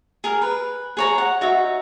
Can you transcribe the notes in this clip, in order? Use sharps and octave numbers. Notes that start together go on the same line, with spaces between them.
G#4 A#4
B4
G#4 C#5 A#5
F#5
D#4 F#4 C#5 E5